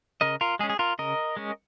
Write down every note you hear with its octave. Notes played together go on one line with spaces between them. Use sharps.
C#3 A#4 D#5
F4 A#4
G#3 C#4 G#4
G#4
F4 A#4
C#3 A#4 D#5
G#3 C#4